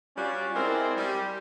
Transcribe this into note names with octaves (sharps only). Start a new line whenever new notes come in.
G3 C#4 F4 F#4 D5
G#3 C4 E4 A#4 C5 D5
G3